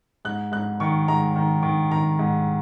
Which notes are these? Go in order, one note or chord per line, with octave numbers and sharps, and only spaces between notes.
G#2 F#6
G#2 F#6
D#3 C#6
G#2 A#5
D#3
D#3
D#3 A#5
G#2